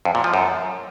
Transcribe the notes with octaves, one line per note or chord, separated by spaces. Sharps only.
F2
A#2
F3
F#2